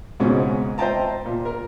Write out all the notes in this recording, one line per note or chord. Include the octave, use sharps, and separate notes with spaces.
C#2 G#2 B2 G#3 C4 C#4
C5 D#5 E5 G5 A5 A#5
A#2
A#4